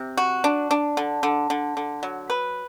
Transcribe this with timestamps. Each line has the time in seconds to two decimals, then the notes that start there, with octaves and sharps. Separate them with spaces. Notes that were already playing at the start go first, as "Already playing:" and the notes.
Already playing: C3
0.17 F#4
0.44 D4
0.71 D4
0.97 D3
1.23 D3
1.50 D3
1.77 D3
2.03 F#3
2.30 B4